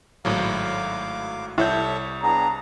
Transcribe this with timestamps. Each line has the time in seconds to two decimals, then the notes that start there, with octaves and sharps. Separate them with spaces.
0.25 G#1 A2 F#3 F5 D6
1.58 C2 E4 A4 C#5 E5 G6
2.23 B3 D4 G#4 A#5